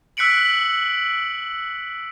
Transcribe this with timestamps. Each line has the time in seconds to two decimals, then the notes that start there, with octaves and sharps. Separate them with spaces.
0.17 E6 F#6 B6 C#7 D7 F#7